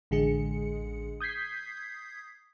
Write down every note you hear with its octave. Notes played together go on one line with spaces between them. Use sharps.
A1 D3 G#3 G#4 C#7
D#6 G6 G#6 B6 C7